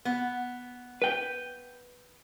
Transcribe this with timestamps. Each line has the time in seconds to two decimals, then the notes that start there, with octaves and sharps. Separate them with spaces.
0.05 B3
1.02 B4 G5